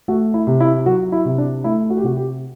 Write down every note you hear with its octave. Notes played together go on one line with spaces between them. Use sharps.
A3 F#4
E4
C3
E4
F#3 F#4
E4
C3
D4
A3 E4
F#4
G4
C3 F#4
G4